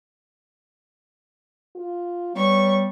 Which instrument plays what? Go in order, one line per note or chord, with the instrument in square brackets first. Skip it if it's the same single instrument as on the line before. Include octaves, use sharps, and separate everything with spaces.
[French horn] F4
[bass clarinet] G3 [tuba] B3 [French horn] C#5 [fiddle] C#6